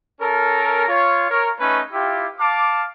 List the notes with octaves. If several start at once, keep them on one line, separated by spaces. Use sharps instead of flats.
C#4 A4 A#4
F4 C#5
A#4 C#5
A3 C#4 D#4 B4
E4 F4 G4
F5 A5 D6